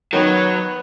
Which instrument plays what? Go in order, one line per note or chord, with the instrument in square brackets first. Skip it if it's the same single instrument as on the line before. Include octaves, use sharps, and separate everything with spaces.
[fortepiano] D#3 [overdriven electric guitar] F#3 [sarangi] B3 [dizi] C#5